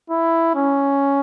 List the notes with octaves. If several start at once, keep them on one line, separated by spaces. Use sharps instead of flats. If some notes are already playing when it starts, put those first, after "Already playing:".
E4
C#4